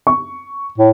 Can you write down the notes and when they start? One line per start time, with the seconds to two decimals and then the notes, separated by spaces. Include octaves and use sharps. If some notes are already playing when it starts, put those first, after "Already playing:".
0.07 C#6
0.78 A2